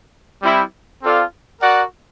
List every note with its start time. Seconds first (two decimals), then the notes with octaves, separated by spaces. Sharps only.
0.41 G3 C4 E4
1.01 C4 F4 A4 D5 F5
1.61 F#4 A#4 D5 F#5